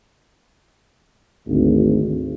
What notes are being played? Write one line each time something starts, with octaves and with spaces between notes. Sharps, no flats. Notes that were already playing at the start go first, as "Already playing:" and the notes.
G#1 D2